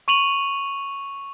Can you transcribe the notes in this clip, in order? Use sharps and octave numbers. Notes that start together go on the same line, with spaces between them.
C#6 D#7 F7 F#7